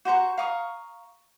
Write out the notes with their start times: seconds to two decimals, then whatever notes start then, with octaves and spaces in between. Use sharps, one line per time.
0.05 F#4 C5 A#5 C#6
0.38 F5 A#5 C#6 D#6